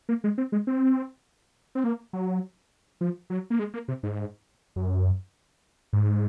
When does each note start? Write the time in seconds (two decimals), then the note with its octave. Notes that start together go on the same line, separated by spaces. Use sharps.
0.09 A#3
0.24 G#3
0.38 C4
0.52 G#3
0.67 C4
1.75 C4
1.84 A#3
2.13 F#3
3.01 F3
3.30 F#3
3.50 A#3
3.59 G#3
3.74 A#3
3.88 C3
4.03 G#2
4.76 F#2
5.93 G#2